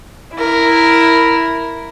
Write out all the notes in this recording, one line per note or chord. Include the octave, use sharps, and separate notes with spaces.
E4 A#4